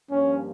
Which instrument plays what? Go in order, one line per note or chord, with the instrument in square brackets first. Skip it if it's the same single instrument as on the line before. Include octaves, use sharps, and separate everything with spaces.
[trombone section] G2 F3 A#3 [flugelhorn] C#4